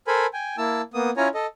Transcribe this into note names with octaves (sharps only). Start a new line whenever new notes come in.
A4 A#4 C5 G#5 B5
G5 G#5
A#3 E4 A5 E6
A#3 B3 D#6
C#4 E4 F4 C#5 G#5 A#5
A4 D#5